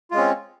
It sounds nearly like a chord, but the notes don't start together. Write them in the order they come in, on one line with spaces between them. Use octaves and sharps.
F4 G#3 C#4 C4